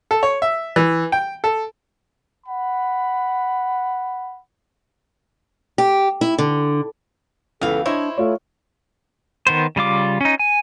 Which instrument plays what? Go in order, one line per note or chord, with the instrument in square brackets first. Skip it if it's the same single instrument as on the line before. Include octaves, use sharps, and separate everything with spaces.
[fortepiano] A4
C#5
E5
E3
G5
A4
[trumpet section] F#5 B5
[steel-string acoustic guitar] G4
E4
D3
[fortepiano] C#2 E3 B3 [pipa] B2 F5 [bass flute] A4
[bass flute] D4 [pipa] E4 [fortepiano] C5 C#5 D#5
[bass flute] A3 [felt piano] F4 C#5
[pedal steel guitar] D#3 B3 C5
C#3 G3 F4 D6
C#4 D#4
G#5